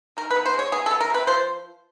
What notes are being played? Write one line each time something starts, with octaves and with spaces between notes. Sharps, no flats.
D#3 A#4
B4
B3
C5
G#3 C#5
B3 G#4
A4
B3
A#4
C3 B4
F3 C5